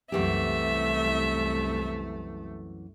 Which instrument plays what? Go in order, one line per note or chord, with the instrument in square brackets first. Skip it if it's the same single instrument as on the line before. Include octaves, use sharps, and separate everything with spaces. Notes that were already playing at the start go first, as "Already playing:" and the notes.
[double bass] C2 A3 [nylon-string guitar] F#2 E3 G4 [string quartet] E5